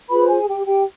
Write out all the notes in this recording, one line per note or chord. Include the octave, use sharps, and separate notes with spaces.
F4 G#4 B4 C5 B5
G#4 G#5
G4 G5
G4 G5